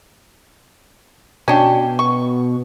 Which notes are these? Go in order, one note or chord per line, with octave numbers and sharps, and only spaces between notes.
B2 C#4 D4 G4
C#6